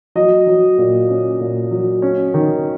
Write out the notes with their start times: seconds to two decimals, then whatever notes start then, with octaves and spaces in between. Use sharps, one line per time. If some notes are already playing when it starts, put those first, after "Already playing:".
0.15 F#3 D#5
0.47 F#3
0.78 A#2
1.09 C#4
1.40 A#2
1.71 F#3
2.02 C#4
2.34 D#3